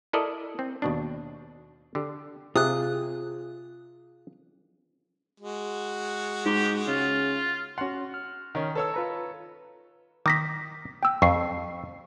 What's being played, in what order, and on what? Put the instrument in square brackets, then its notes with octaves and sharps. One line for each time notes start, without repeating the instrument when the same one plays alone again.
[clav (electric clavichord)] E4 A4 A#4 D5 D#5
C4
D#2 B2 D4
D3 G4
[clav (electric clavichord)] C3 [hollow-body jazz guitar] F4 G#4 [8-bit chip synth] D#6 F#6
[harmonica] G#3 F#4
[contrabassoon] G#2 [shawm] G4
[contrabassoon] C#3 [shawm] F4
[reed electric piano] C#4 C6 [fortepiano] F#4 F#5
[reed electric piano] F6
[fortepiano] D#3 C#4
[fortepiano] A4 C#5 E6 [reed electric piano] B4
[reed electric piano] F4 B4 A#5
[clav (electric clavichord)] D#3 [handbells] D6 A#6 B6
[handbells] G5 E6
[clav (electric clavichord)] F2 [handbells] C#6 C7